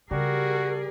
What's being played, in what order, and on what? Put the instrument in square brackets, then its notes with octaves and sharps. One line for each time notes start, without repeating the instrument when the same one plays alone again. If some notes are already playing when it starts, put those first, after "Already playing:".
[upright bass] C#3 [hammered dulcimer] G3 [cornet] F#4 [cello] G#4 A#4